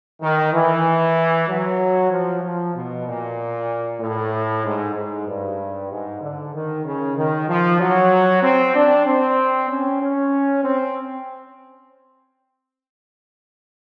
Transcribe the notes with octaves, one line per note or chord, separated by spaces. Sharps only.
D#3
E3
F#3
F3
F3
B2
A#2
A2
G#2
G#2
G2
G#2
D3
D#3
C#3
D#3
F3
F#3
C4
D4
C4
C#4
C#4
C4